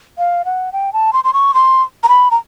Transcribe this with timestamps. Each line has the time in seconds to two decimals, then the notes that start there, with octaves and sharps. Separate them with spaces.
0.18 F5
0.45 F#5
0.72 G5
0.93 A5
1.13 C6
1.24 C6
1.33 C#6
1.54 C6
2.03 A#5
2.09 B5
2.31 A#5